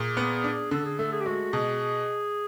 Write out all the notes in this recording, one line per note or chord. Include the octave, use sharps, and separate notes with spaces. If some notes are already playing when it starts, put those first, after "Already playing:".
Already playing: A#2 G#4
B3
D4
D3 A4
G#4
A3 A4
G#4
G4
G#3 F#4
B2 G#4